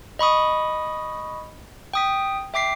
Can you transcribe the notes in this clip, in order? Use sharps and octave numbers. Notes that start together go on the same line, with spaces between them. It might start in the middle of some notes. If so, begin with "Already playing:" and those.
D#5 B5 C#6 D#6
G5 D#6 B6
E5 G5 D6 B6 C7